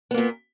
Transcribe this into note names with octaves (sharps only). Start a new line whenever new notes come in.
A#2 A#3 B3